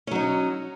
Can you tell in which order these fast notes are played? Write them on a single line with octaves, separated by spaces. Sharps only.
C#4 F#3 D#4